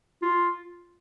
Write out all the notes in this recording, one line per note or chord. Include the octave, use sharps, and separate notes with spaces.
F4